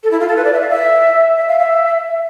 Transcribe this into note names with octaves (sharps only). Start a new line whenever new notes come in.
A4
E4
F4
A4
B4
D5
E5
F5
E5
E5
F5
E5